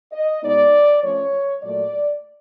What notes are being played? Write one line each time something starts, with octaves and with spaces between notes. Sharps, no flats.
D#5
B2 G#3 B3 D#4 D5
F3 A3 C#4 C#5
A#2 F#3 A3 D5